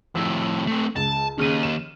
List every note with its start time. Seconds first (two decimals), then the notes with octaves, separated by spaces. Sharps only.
0.15 F2 A2 E6
0.67 A3 C4
0.96 C#2 A5
1.38 D#2 C#3 F6 D#7
1.63 E7